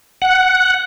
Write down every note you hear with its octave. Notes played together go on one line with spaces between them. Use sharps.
F#5